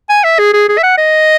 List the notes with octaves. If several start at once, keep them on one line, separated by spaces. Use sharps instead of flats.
G#5
E5
G#4
G#4
G#4
E5
F#5
D#5